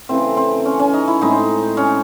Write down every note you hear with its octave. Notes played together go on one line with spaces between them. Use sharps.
C#3 E3 A3 C4
C4
C#4
C#4
D#4
E4
A2 G#3 C4 D#4
C#4